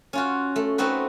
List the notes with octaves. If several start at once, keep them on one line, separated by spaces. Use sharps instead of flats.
C#4 F4 F#4
A3
A3 C4 D#4 F#4 B4